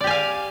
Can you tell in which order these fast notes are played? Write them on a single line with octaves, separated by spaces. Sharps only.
D5 G4 G#5 F5